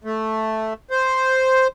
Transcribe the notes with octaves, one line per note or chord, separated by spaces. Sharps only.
A3
C5